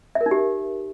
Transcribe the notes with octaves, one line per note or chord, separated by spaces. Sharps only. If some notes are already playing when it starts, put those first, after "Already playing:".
E5
A#4
D#4
G4